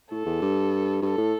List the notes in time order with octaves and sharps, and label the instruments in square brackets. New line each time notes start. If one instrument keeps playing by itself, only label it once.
[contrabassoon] A2 [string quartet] A4
[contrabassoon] E2
G2
[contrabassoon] G2 [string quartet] A4
[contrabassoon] A2